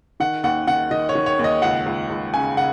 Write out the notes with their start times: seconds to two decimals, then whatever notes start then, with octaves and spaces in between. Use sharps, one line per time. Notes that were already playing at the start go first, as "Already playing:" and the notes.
0.20 D#3 F#5
0.44 D#2 F#5
0.67 D#3 F#5
0.91 D#3 D#5
1.09 C#5
1.15 D#3
1.26 C#5
1.39 D#2
1.44 D#5
1.62 C#2 F#5
1.86 C#2
2.10 C#2
2.34 C#3 G#5
2.57 C#3 F#5